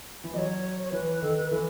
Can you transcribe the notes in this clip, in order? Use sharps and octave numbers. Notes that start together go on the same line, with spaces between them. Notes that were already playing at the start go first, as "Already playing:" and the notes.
E3
F#3 C#5 D#5
C#5
E3 B4
D#3 A4
B4
E3 A4